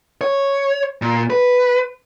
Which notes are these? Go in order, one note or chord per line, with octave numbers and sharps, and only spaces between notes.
C#5
A#2
B4